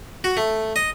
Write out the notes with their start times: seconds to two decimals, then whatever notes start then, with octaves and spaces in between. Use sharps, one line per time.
0.24 F#4
0.37 A3
0.76 D#5